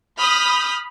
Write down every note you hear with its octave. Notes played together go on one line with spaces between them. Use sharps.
B5 D#6 F6 G6 B6